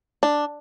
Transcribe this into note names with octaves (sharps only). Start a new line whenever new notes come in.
D4